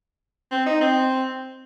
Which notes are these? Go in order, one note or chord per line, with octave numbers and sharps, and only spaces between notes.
C4
D#4
C4